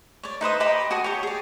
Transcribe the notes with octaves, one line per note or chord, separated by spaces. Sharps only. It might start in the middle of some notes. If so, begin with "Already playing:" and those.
C#5 D5
D#4 B4 C5 D#6
G4 D#5 B5 D6
F#4 A4 G#5 D#6
G4 C#5
G#4 D5